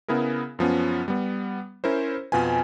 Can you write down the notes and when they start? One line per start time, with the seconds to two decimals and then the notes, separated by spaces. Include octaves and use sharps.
0.08 C#3 B3 E4 G#4 A#4
0.59 F#2 F3 B3 C#4
1.08 G3 B3
1.84 C#4 E4 A#4 C5
2.32 F2 B2 F4 B4 G#5